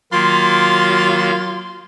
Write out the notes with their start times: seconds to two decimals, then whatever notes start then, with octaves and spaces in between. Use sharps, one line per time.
0.12 D#3 F#3 A#3 F4 C6